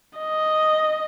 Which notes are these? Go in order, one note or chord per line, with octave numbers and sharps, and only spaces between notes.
D#5